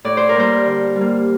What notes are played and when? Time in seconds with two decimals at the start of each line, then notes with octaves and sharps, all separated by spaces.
0.04 A2 D5
0.17 C5
0.29 A#4
0.35 G3 A#3 C5
0.66 D3
0.96 G3
1.01 A#3